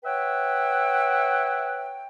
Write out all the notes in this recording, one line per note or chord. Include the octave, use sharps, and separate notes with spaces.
B4 C#5 E5 F#5 G5